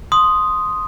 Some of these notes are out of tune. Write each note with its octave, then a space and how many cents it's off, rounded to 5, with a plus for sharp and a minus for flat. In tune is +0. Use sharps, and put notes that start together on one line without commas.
C6 +0 D#6 +0